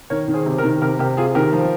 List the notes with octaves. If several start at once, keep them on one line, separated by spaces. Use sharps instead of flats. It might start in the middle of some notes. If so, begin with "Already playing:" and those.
D#3 A#4 C#5
D#3
G#4 C5
C3
G4 A#4
D#3
C3 G4 A#4
C3 G4 A#4
C3 F4 G#4
D#3 G4 A#4
F3